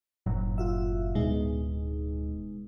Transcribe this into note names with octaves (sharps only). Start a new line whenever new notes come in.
F#1 A2 F#3
F4 F#4 E5
D1 B2 G#3 D#4